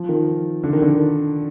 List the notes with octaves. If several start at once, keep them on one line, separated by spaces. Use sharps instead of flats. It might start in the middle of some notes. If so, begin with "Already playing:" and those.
Already playing: F3
D#3
D3
D#3
D3
D#3